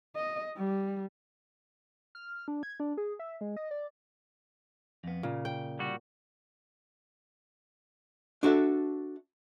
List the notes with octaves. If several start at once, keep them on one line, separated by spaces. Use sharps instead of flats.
D#5
G3
F6
F6
D4
G#6
D4
G#4
E5
G#3
D#5
D5
F2 B3
A#2 C#3
G5
G3 F#4
D4 F#4 A4 E5